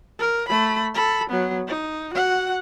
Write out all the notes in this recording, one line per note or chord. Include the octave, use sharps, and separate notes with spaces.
A#4
A3 B5
A4 B5
F#3 B3
D#4
F#4 F#5